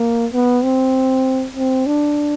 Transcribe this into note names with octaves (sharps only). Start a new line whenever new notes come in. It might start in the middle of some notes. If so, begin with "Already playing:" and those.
Already playing: A#3
B3
C4
C4
D4